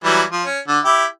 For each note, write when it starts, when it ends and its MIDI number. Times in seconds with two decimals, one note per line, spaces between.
0.04 0.23 52
0.04 0.23 54
0.04 0.23 55
0.32 0.44 53
0.44 0.59 61
0.68 0.79 50
0.85 1.05 64
0.85 1.05 67